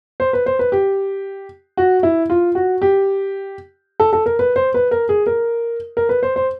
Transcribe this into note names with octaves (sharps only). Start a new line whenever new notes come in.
C5
B4
C5
B4
G4
F#4
E4
F4
F#4
G4
A4
A4
A#4
B4
C5
B4
A#4
G#4
A#4
A#4
B4
C5
C5